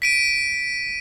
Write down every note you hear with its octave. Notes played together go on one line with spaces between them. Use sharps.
B6 D7 D#7